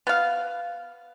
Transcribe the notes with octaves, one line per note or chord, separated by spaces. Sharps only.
B3 F5